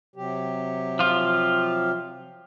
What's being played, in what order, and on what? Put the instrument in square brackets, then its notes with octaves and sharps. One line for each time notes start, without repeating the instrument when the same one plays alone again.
[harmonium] C3 F#3 G4
[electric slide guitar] F3 F4